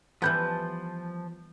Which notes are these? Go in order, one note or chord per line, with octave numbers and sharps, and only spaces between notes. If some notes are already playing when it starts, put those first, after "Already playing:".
E3 F3 G3 B3 A5 G6